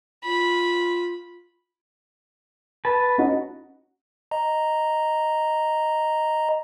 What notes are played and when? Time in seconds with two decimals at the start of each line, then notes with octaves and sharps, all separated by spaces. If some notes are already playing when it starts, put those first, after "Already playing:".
0.25 F4 B5
2.85 B4 A5
3.18 C#4 D#4 F#4
4.31 D#5 A#5